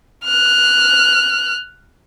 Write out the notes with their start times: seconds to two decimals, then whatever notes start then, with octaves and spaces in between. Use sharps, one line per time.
0.25 F6 F#6